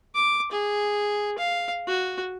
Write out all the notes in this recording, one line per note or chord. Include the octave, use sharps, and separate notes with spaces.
D6
G#4
F5
F#4